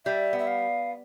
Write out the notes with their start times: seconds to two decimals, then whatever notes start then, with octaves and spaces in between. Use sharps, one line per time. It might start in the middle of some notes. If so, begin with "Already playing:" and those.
0.05 G3 E5
0.33 B3
0.39 E5
0.47 F5